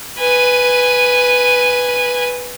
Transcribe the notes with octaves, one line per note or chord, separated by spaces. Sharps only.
B4 G#5